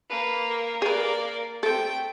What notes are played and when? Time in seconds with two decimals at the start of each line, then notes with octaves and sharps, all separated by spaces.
0.10 A#3 B4
0.51 A#4
0.82 A#3 G#4 B4 D5
1.63 A3 C4 A4 G5